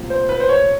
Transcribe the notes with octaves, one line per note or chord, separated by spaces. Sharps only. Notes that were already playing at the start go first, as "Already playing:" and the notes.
Already playing: C2 A#2 F3 A3 C4
C5
B4
C5
C#5